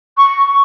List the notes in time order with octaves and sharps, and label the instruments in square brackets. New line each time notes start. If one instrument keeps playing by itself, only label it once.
[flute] C#6